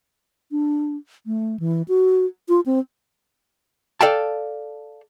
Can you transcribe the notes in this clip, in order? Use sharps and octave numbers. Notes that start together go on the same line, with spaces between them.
D4
A3
E3
F#4
F4
C4
A4 D5 F5 G5 A5